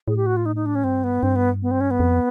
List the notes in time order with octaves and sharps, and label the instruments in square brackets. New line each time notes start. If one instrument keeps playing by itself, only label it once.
[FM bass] A2 [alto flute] G#4
[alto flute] G4
F#4
F4
D#4
D#4
D4
C#4
[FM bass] G2 [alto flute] C4
[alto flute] B3
[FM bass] G2 [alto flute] C4
[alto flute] B3
B3
C4
C#4
B3
[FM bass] F2